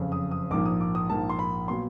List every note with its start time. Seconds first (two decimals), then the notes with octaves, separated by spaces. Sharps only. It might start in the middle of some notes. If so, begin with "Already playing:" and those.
Already playing: F#1 F2 C#3
0.12 D#6
0.31 D#6
0.51 A#1 G#2 F3 A#3 D6
0.65 D#6
0.80 D6
0.95 D#6
1.10 A#1 G#2 F3 A#3 A5
1.29 C6
1.39 B5
1.68 A#2 F#3 B3 C6